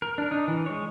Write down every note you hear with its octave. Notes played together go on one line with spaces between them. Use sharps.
A#4
D4 A#4
D4 D#4
E3
G#3 C#5